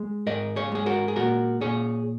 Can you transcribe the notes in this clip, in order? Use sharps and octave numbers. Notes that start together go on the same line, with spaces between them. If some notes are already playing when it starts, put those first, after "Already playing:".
Already playing: G#3
G#2 A#4 D#5
G#4 C#5
G#3 G#4
F#4 A#4
G#4
A#2 F#4 A#4
A#2 G#4 C#5